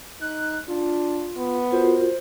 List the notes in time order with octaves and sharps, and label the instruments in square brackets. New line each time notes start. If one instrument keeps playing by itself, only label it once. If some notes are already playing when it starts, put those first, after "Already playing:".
[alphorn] D#4 [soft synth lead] F#6
[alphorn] D4 [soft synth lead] F4
[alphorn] B3
[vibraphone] F4 F#4 A#4 [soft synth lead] C5